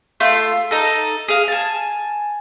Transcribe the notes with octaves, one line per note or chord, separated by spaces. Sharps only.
A3 F4 C6
D#4 A4
G#4 F5
G#5 A5